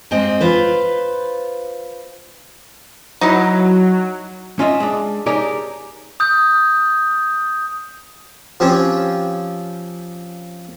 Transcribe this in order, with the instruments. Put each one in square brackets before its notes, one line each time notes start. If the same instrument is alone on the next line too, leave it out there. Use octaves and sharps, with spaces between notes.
[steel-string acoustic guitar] G2 G#3 C4 D#5
F4 B4 C5
[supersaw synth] F#3 [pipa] D#4 E4
[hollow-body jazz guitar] C#4 F4 D#5 E5
G#3 D4
D#4 G4 G#4 A#4 C#5 D5
[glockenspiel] D#6 G6
[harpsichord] F3 C4 C#4 G4